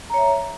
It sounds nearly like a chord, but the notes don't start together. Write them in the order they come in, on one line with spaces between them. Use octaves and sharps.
A#5 C#5 E5